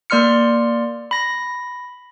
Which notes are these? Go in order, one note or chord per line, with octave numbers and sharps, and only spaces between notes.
A#3 D5 C6 F6 C#7
B5 A#6